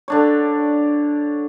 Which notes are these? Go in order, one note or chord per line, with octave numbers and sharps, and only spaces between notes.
D3 D4 C#5